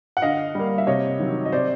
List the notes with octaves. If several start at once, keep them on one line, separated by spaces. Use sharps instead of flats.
F#5
D3 D#5 F5
G3 A#3
E5
C3 C#5 D#5
D#3 F#3
D#5
C3 C5 D5